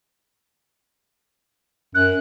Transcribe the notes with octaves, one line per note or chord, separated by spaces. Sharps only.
F#2 F#6